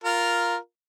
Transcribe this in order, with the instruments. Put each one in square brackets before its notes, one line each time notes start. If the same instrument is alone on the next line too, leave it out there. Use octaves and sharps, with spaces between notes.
[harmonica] F4 A#4